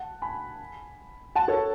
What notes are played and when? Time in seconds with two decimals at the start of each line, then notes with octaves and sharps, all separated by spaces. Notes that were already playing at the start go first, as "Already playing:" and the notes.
Already playing: F#5 A5
0.22 G#5 B5
1.35 F#5 A5
1.48 A4 C#5